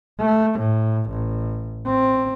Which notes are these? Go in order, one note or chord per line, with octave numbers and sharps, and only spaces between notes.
A3
A2
A1
C4